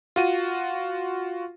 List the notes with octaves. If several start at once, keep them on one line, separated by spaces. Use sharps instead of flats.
F4 F#4 D#7